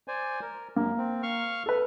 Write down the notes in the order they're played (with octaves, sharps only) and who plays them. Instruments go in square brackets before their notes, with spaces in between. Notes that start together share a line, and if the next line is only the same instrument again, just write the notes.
[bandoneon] C5 D5 G#5
A#4
[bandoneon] F#2 [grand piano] A#3
[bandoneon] C4
F5 C#6 F6
[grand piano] A4 B4